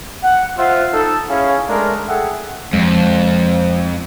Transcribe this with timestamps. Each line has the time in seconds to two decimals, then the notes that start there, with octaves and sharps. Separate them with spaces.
0.23 F#5
0.58 F4 C5 E5 F#5
0.94 D#4 A4
1.30 C#4 E4 G#4 C#5 F5
1.69 G#3 A3 D4 A#4
2.08 G#4 A4 E5 F#5 G5
2.73 F2 F3 G#3 C4